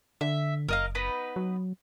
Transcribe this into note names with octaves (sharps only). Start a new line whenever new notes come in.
D3 E5
F#1 A#4 D#5 F5
B3 D#4 B4
F#3